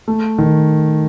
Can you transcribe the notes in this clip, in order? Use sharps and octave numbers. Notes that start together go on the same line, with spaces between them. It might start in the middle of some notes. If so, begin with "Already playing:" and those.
A3
D#3